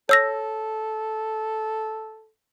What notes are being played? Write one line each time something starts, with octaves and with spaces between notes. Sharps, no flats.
A4 C#5 E6 A#6